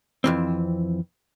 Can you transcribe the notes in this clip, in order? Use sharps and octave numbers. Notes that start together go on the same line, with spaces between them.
F2 E3 C4